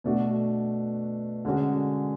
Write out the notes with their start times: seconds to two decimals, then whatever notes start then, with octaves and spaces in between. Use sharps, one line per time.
0.04 B2 A3 D4 F#4
1.45 D3 G#3 C#4 F#4